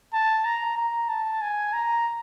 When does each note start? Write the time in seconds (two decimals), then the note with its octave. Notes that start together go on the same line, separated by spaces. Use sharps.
0.13 A5
0.45 A#5
0.77 A#5
1.09 A5
1.42 G#5
1.73 A#5